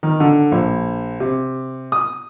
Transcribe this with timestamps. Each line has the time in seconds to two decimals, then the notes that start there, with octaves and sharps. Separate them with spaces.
0.03 D#3
0.20 D3
0.52 A#1
1.20 C3
1.92 D#6